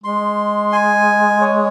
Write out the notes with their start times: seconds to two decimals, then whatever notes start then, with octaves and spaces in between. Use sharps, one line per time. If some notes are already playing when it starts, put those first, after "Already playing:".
0.04 G#3 C6
0.72 G#5
1.41 C#5